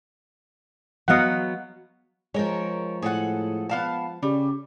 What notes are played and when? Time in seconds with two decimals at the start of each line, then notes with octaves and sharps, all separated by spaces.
1.08 F#3 B3 D#5 F5 F#5
2.34 F3 G#3 A#4 C#5
3.02 A2 G#4 A4 F#5
3.69 B3 F5 A5
4.23 C#3 G3